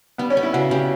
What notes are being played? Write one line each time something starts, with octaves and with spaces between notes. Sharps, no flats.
G3 B3
C#4
B3
E4
C#3 F#4
C#3 G4